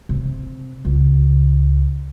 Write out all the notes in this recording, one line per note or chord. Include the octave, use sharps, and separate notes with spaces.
C3
C#2